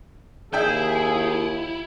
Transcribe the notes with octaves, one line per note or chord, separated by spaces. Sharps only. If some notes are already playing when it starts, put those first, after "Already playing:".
D#2 E4 G#4 E5 G5 G6